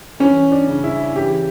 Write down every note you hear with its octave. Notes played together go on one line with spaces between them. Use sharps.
E3 C#4
D4
C#3
E4
E3 G4